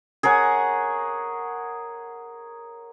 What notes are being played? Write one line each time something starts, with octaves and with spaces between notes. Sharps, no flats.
G#4 A#4 C#5 F#5